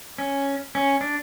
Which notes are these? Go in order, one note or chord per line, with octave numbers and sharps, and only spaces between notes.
C#4
C#4
D4